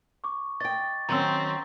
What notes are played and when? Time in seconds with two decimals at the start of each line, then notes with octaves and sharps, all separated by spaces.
0.24 C#6 D6
0.60 D#5 G5 A6
1.09 D#3 F#3 C4 C#4 A#5 C6 E6